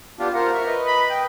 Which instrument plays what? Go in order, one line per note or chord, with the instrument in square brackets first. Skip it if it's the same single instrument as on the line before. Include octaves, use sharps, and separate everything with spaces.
[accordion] B3 D4 G4 [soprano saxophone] F4
[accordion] F4 C5 F#5 [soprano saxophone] A#4
[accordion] E5 C#6
B4 D#5
[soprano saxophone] B5
G5